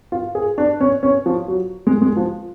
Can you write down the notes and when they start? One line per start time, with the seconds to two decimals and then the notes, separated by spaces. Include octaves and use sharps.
0.12 F4
0.35 G#4
0.58 D4
0.80 C#4
1.03 C#4
1.26 F3
1.48 F#3
1.87 G#3
2.02 G#3
2.17 F3